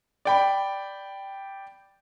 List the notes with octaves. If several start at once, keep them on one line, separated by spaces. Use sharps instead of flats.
D5 G5 B5